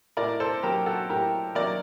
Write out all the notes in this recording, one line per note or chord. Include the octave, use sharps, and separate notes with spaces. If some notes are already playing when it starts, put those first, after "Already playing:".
A2 A#4 D5
A4 C5
F#3 A#3 G4 A#4
F#4 A4
A2 G4 A#4
F#3 A#3 A#4 D5